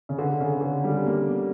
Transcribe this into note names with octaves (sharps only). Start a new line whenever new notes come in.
C#3
D3
C#3
D3
G3
A#3